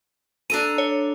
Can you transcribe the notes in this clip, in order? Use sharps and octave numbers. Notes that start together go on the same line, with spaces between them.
D4 A4 A#5 D#7
C#5